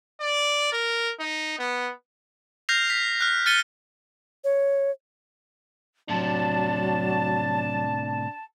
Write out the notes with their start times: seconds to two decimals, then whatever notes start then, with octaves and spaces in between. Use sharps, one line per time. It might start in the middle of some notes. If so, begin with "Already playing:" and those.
0.20 D5
0.72 A#4
1.20 D#4
1.59 B3
2.69 F6 G6 A#6 C7 F7
2.90 B6
3.20 F6 F#6
3.46 F6 A6 C#7 D#7 G7
4.44 C#5
6.09 A2 C3 F#3 D4 A5